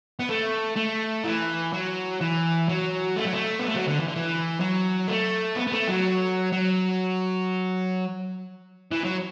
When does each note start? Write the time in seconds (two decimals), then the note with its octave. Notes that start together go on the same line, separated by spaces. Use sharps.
0.19 B3
0.29 A3
0.76 A3
1.24 E3
1.73 F#3
2.21 E3
2.69 F#3
3.16 A3
3.25 F#3
3.33 A3
3.59 B3
3.68 A3
3.76 F#3
3.88 D3
4.00 E3
4.08 D3
4.15 E3
4.60 F#3
5.08 A3
5.56 B3
5.67 B3
5.72 A3
5.88 F#3
6.52 F#3
8.92 E3
9.05 F#3